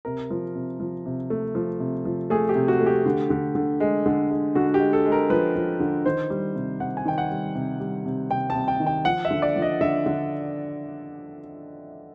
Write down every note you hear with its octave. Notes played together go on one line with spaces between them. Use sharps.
C3 A#4
F3
C3
F3
C3
A3
F3
C3
F3
A3 G#4
G4
C3
F#4
A3
G4
D3
D3
D3
G#3
D3
G#3
D3 F#4
G4
G#3
A4
G#3
A#4
F3 B4
F3
D3
D#3 C5
G3
C3
C3 F#5
G#5
D#3 G5
F#5
G3
C3
G3
C3
C3 G5
A5
C3
G5
D#3
G5
F3 F#5
E5
D3
D5
F3
D#5
D3 E5
D3